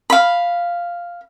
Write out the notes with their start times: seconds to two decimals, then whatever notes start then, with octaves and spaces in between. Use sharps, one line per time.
0.10 F5 B5